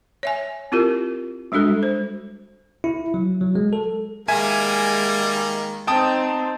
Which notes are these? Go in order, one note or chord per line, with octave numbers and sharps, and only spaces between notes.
C#5 E5 G#5
C4 E4 F4 G4 A#4
G3 G#3 D4 F#4 A4
C5
E4
F#3
F#3
G#3
A4
D#3 G3 G#3 A#3 E5 G#5
C4 D#4 G5 A5 D#6